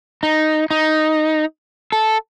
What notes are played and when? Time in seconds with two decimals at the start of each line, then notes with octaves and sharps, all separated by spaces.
0.23 D#4
0.71 D#4
1.92 A4